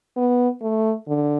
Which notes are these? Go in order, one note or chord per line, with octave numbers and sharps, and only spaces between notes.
B3
A3
D3